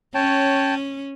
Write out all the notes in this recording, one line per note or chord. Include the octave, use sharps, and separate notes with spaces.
C#4 C#5 G5 A5